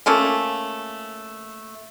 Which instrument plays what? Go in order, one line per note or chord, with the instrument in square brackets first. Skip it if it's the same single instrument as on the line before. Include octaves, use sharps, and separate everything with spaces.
[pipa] A3 A#3 C#4 F4